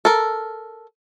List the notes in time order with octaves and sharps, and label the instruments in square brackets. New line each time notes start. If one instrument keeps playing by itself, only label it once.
[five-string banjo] A4 A#4